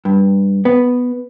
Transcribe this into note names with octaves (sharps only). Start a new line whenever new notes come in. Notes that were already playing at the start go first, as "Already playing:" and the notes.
G2
B3